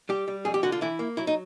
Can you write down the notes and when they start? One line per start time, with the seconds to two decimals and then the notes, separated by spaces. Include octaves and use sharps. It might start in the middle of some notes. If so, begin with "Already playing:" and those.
0.09 G3 G4
0.28 G3
0.45 F2 G#4
0.54 G4
0.63 D3 F#4
0.72 F4
0.81 E3 E4
0.99 A#3
1.17 F#3 E4
1.27 D#4